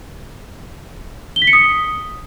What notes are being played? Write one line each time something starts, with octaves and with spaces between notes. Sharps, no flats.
G7
B6
C#7
D#6